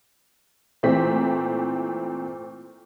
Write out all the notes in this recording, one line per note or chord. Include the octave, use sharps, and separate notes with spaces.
A#2 E3 A3 C4 B6